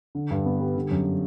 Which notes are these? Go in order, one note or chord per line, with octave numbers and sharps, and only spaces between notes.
D3
G2
B3
G3
D3
F#2